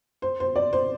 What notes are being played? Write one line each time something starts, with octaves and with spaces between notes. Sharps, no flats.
C5
C5
D5
C5